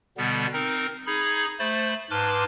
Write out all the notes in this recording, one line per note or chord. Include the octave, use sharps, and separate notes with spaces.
B2 D3 G3 B3
C4 D#4 A#4
D#4 G#4 B5 G#6
A3 C5 B5 A6
G#2 B4 A5 C6 D6 F6